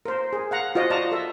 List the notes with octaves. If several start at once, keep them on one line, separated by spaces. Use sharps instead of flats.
A#4 C5
G#4
F5 F#5 A#5
F4 F#4 C5 D#5
D5 D#5 A5 A#5
A4 A#4 E5